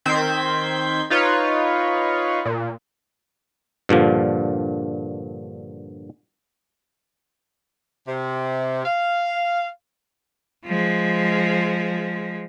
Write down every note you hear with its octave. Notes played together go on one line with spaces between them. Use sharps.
D#3 C4 C5 G6 G#6 B6
D#4 F4 B4 C#5
A#2
G2 A#2 D3 F3
C3
F5
F3 G#3